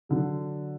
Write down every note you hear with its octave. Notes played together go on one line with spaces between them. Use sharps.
D3 F#3